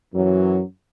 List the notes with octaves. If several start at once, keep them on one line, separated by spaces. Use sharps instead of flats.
F#2 E3 F#3